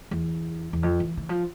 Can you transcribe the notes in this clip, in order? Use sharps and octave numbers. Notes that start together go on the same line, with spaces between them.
E2
E2
F2
E3
E3
F3